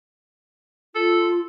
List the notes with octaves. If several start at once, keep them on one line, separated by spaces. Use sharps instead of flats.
F4 A4